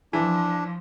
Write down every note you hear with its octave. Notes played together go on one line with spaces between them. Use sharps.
E3 F3 D4